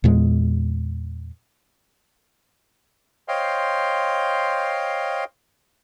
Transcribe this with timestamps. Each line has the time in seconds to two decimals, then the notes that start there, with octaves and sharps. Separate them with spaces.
0.04 E2 A#2 G#3
3.28 C5 C#5 D#5 F5 G5 C6